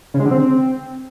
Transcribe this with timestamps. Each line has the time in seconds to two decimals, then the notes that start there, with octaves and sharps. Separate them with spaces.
0.14 C#3
0.20 G#3
0.25 D3
0.31 C4